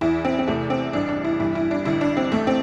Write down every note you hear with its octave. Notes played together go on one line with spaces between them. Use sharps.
E2 E3 E4
C4
C4
E2 C3 E3 A3
C4
A1 G2 E3 D4
D4
E4
G1 G2 E3 E4
E4
D4
A1 G2 D3 E4
D4
C4
A1 A2 E3 A3
C4